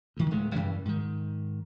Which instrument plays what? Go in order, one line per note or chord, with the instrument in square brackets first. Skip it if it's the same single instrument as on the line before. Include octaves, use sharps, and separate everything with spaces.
[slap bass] D2 D#3
D1 G#3 A3
F#2 C#3 E3 G3
G#2 D#3